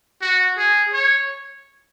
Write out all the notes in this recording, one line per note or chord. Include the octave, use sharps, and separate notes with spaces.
F#4
G#4
C#5